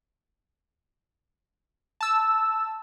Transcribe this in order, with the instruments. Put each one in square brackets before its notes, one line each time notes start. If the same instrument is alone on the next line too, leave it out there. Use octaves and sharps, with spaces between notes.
[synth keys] A5 E6